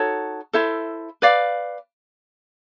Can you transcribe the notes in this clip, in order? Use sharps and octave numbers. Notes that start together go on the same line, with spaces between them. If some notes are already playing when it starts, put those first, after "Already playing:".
Already playing: D#4 F#4 A4 C#5
E4 A4 C5 E5
B4 D5 F5